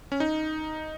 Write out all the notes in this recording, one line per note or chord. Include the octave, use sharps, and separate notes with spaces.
C#4
D#4